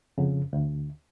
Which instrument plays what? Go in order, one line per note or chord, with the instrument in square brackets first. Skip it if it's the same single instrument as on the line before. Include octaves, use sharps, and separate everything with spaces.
[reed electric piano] F2 C#3
D2